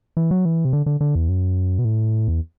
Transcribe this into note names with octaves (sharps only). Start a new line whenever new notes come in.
E3
F#3
E3
C3
D3
D3
D3
E2
F#2
B2
A2
E2